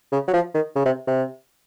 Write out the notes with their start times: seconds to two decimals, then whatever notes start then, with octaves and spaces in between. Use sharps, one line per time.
0.12 C#3
0.28 F#3
0.33 F3
0.54 D#3
0.76 C#3
0.86 C3
1.07 C3